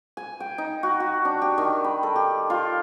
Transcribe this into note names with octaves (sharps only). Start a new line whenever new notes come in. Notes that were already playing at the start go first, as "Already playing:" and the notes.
G#5
G5
D#4
F#4
F#4
D4
G4
D#3
B5
A4
G4
F4